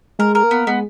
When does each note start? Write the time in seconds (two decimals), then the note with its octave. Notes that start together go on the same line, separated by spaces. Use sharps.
0.19 G#3 A#4
0.35 A#4
0.43 A#3
0.51 B3
0.67 G#3 B3